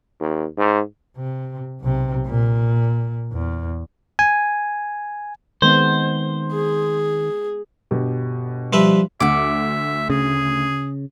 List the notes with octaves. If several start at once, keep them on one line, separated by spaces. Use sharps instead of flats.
D#2
G#2
C3
B1 C3
A#2
E2
G#5
D#3 G#3 B3 C4 C5
G#4
G1 B2 G4
F3 G3 B4 E5
D2 E5 F#5 D6
C#3 G#4